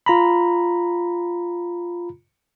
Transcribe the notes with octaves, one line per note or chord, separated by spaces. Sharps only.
F4 A#5 B5